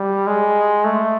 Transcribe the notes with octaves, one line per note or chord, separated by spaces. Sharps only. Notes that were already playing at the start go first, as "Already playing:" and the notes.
Already playing: G3
G#3
A3